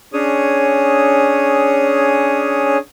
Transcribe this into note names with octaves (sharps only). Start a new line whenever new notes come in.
C#4 D4 G#4 C#5 D#6